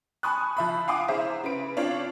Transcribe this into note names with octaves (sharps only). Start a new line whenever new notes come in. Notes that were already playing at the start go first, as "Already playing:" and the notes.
G#5 A5 B5 C#6 D#6 F#6
F3 E5 B5
F5 F#5 G#5 C6 D6 D#6
E4 G#4 C5 E5 A#5
C#3 B4 D7
C4 D4 F4 C#5 F5